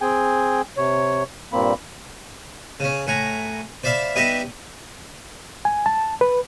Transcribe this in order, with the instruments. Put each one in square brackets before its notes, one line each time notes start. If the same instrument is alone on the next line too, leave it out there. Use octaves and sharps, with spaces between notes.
[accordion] C4 G#4 G5 G#5
C3 C#5
G2 A#2 A#3 C4 B5
[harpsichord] C#3 C#4
A2 F#5 G#5 A#5
C5 D5 E5 F5 B5
G3 B3 D#4 G4 D#5 E5
[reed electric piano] G#5
A5
B4